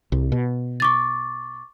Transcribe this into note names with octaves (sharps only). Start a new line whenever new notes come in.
C2
B2
C#6 D6 A6